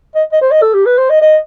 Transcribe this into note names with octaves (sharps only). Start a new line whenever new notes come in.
D#5
D#5
C5
D#5
A4
G4
B4
C5
D#5
D#5